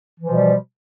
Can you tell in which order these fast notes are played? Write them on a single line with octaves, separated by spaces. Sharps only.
E3 F3 B2 G3